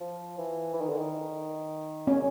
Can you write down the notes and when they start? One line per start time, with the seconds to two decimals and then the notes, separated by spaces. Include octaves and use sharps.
0.01 F3
0.38 E3
0.73 E3
0.81 D#3
0.89 D3
0.97 D#3
2.07 C#4